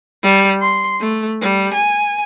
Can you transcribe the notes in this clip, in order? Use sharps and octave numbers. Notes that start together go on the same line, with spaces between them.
G3
C6
A3
G3
G#5